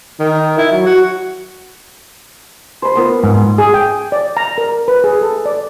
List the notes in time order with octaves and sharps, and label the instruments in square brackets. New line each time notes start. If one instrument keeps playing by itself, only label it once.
[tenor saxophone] D#3
E4
F#3
F#4
[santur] C5 B5
A#3 B3 F4
[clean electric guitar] G#2
[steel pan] G#4
G5
D5
A#5
A#4
B4
G#4
A4
D5